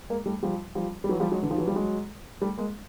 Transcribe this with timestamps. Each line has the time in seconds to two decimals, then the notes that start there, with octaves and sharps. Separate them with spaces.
0.10 G#3 A#3
0.26 G3 A3
0.43 F3 G3
0.75 F3 G3
1.04 G3
1.09 E3 F#3
1.20 F3 G3
1.32 F#3 G#3
1.42 D3 E3
1.51 D#3 F3
1.58 E3 F#3
1.67 F3 G3
1.76 F#3 G#3
2.41 G3 A3
2.58 G#3 A#3